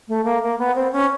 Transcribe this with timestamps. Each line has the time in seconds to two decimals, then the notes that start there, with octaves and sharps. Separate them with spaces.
0.08 A3
0.25 A#3
0.43 A#3
0.59 B3
0.76 C4
0.92 C#4